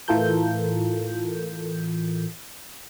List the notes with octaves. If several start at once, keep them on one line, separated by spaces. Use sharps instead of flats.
A2 E3 F4 A4 A#4 G6